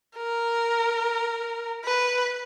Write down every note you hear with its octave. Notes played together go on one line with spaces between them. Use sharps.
A#4
B4